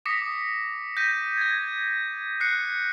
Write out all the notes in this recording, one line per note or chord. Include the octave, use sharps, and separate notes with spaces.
D6 D#6 A#6 B6 C#7
G6 A#6 B6 D#7
G#6 A#6
F#6 C7 C#7